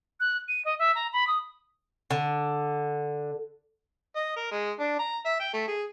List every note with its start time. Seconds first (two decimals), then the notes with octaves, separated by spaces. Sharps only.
0.20 F#6
0.48 D#7
0.65 D#5
0.79 E5
0.95 A#5
1.13 B5
1.27 D#6
2.11 D3
4.16 D#5
4.36 A#4
4.51 G#3
4.80 D4
4.99 A#5
5.25 E5
5.40 G5
5.53 A3
5.67 G#4